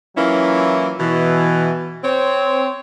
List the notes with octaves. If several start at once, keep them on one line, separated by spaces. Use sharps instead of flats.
E3 F#3 A#3 C#4 E4 F4
B2 E3
C4 C#5